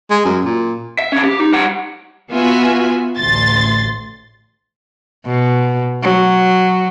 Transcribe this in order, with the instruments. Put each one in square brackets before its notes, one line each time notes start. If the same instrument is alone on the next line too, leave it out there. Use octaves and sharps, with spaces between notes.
[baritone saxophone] G#3
F#2
A#2
[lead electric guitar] E5
D3 C#4
G4
D#4
G3 F#5
[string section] B3 F4 F#4 E5 G#5
A1 D2 C6 A6
[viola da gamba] B2
F#3